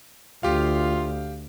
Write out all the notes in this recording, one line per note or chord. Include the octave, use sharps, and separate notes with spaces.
D2 F4 G4 F5